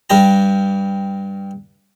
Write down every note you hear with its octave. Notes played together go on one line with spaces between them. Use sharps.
G2 G3 G4 A#5